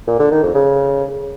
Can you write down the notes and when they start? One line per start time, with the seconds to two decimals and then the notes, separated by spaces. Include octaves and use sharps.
0.07 A#2
0.19 D3
0.31 D#3
0.43 F2
0.55 C#3